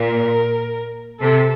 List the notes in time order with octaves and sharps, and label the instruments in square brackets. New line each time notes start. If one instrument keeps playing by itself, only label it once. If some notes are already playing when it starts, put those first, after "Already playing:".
Already playing: [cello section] A#2 [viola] A#4
[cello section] C3 [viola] A4